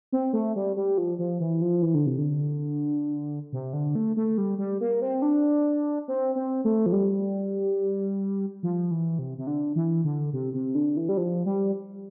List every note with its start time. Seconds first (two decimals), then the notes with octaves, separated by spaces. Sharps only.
0.12 C4
0.33 A3
0.56 G3
0.77 G3
0.98 F3
1.19 F3
1.40 E3
1.62 F3
1.82 E3
1.94 D3
2.06 C3
2.18 D3
3.52 C3
3.73 D3
3.95 A3
4.17 A3
4.38 G3
4.58 G3
4.81 A#3
5.02 C4
5.22 D4
6.08 C4
6.36 C4
6.65 A3
6.86 F3
6.93 G3
8.63 F3
8.91 E3
9.19 C3
9.38 C3
9.47 D3
9.76 E3
10.04 D3
10.33 C3
10.54 C3
10.75 D3
10.97 E3
11.09 G3
11.17 F3
11.46 G3